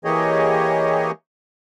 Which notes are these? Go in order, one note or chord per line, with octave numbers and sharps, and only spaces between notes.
E3 A#3 G4 G#4 C#5 D#5